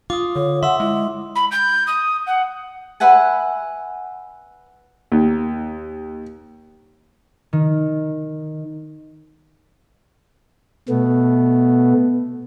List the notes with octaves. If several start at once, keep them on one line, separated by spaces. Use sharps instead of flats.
F4 D6 D#6
D3 C#5
E5 F#5 C6 E6
G#3 E4
B5
G6
D#6
F#5
B4 E5 F#5 G#5
D#2
D#3
B2 A3 B3